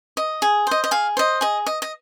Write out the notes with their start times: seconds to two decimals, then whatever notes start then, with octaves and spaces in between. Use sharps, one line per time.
0.17 D#5
0.42 G#4
0.67 C5 D#5
0.84 D#5
0.91 G#4 F5
1.17 C5 D#5
1.41 G#4 D#5
1.67 D#5
1.82 D#5